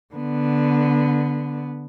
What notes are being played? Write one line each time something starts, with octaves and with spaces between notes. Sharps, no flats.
D3 B3